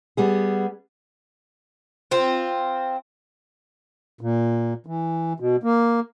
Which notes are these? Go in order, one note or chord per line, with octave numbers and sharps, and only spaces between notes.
G3 B3 G#4
C4 F4
A#2
E3
B2
A#3